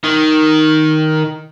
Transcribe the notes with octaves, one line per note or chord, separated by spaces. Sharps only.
D#3